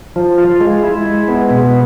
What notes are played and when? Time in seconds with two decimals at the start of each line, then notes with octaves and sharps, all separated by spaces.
0.16 F3
0.38 F4
0.61 G#3
0.83 E4
1.06 G#3
1.28 B3
1.50 B2